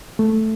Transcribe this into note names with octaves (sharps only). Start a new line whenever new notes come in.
A3